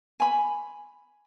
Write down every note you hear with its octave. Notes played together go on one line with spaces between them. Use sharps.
G#5 B5